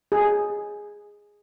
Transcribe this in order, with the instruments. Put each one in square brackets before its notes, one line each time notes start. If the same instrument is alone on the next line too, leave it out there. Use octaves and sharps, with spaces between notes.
[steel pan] G#4